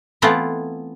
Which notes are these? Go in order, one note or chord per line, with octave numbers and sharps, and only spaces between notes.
E3 A3 B3 C4 E4 F4